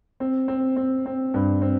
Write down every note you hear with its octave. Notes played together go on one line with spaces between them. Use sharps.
C4
C4
C4
C4
G2
C4